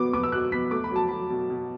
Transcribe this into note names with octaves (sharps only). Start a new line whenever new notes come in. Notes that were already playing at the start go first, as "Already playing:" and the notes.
Already playing: B2 F#3 B3 D6
B3 D6
E6
B2 F#6
B3 B6
A3 D6
B5
F#3 A5
F#3 B5
B2
B2